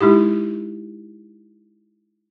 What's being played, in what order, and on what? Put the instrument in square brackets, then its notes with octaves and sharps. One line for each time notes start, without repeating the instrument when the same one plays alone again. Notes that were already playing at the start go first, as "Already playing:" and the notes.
[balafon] G#3 D#4 E4 G4